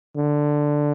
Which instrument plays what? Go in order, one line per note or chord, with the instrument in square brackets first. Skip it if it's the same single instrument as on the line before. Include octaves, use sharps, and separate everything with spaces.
[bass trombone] D3